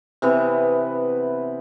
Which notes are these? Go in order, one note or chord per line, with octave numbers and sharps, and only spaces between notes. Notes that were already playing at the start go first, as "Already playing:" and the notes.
C3 E3 B3